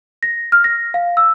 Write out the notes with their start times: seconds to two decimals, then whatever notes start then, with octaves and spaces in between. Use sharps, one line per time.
0.23 A#6
0.52 F6
0.64 A#6
0.94 F5
1.17 E6